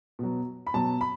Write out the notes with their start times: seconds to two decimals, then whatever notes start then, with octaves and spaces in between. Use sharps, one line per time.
0.19 B2 F#3
0.67 B5
0.74 B2 F#3 A5
1.01 B5